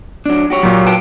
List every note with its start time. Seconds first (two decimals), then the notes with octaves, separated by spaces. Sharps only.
0.26 F#3 D4
0.50 F#4 G4 C#5
0.63 A#2 F#3
0.86 B4 G5 A5